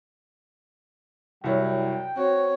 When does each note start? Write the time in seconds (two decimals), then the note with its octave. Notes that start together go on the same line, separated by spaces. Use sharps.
1.44 C2 F#2 F#3 G3 E4 C#5 G5
2.17 C4 F#4 C#5